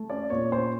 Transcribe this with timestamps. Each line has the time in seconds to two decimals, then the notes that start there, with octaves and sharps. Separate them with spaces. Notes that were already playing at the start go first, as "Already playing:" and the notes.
Already playing: A3
0.10 C#4 D5
0.30 A#2 C#5
0.52 A#2 C5